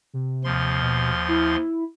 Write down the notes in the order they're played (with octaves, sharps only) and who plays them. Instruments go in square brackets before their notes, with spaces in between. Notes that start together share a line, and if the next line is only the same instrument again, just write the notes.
[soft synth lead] C3
[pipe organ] D#2 F3 C6
[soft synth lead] B2
E4